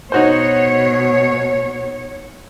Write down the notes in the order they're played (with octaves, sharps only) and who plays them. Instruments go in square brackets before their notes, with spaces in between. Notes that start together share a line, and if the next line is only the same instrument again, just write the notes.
[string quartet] B2 [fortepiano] D#4 F#4 C5 [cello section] C#5